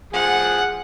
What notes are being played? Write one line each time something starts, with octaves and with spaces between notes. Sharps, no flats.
F3 G#4 F#5